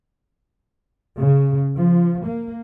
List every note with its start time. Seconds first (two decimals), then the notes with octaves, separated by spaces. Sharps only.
1.20 C#3
1.77 F3
2.26 A#3